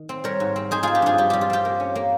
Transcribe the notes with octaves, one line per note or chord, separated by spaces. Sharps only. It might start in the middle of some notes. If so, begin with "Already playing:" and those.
Already playing: D#3
C4
G3 A#4 C#5
G#2
C4
D#4 G#4 C5
C4 F4 G#4
G4
G2 F4 G#4
G3 G4
G3 G4
F4
C4 G4
A#3
C#4
A#3